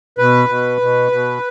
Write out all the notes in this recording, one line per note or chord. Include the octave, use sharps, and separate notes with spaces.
B2 B4
B2
B2
B2